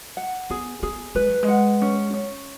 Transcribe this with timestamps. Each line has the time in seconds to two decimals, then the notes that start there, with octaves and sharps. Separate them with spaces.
0.17 F#5
0.50 B3 G#4
0.83 B3 G#4
1.15 G#3 B4
1.29 F#3
1.43 G#3
1.48 F#5
1.82 C#4
2.14 C#4